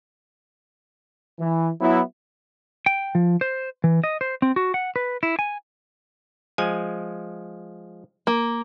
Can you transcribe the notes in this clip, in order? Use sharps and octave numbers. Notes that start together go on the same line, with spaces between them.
E3
F#3 B3 E4
G5
F3
C5
E3
D#5
C5
C4
F#4
F#5
B4
E4
G#5
F3 G#3 G#5
A#3